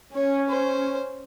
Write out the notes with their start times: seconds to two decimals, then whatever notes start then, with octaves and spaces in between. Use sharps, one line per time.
0.14 C#4 C#5
0.49 C5